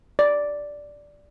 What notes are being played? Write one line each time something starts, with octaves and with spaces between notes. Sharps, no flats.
D5